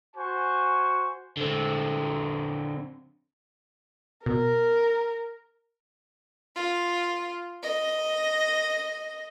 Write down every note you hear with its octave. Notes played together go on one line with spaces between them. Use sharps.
F#4 C5 G#5 C#6
D3 C4
B2 A#4
F4
D#5